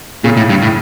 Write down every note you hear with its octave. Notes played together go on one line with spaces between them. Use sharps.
A#2 C#3
A2
G2
A2